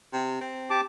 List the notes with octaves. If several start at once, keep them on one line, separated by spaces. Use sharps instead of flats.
C3
C4
G4 A5 D6